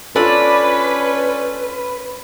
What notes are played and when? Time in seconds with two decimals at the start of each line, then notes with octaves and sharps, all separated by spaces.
0.16 C#4 D4 F4 A4 B4 D5